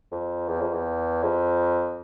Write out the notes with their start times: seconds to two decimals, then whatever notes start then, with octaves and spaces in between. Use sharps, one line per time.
0.12 F2
0.48 E2
0.61 F2
0.73 E2
1.23 F2